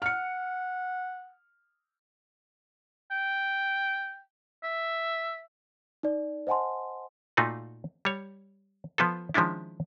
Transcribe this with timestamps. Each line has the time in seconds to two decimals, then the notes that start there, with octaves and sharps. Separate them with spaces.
0.02 F#5 F6 C#7
3.11 G5
4.64 E5
6.03 D#4 D5
6.47 C5 D#5 F#5 G#5 A5 C6
7.37 A#2 A3 D#4 F4 F#4
8.05 G3 C#5
8.98 F3 B3 F4 A4
9.34 D#3 F3 G#3 C#4 D4 E4